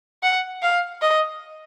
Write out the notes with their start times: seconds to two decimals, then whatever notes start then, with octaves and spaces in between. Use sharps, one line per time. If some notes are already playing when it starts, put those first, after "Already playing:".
0.23 F#5
0.62 F5
1.02 D#5